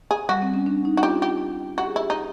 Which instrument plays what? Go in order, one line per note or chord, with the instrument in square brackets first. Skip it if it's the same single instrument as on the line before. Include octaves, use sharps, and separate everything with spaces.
[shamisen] G#4
[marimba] G3 [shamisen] F#4
[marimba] C4
C#4
D4
D#4
[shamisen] F#4
[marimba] F4 [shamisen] G4
[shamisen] G4
[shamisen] F#4 [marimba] G4
[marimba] G#4
[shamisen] E4 [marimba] G4
[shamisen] D#4